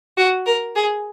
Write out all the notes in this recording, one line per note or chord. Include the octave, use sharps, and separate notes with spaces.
F#4
A#4
G#4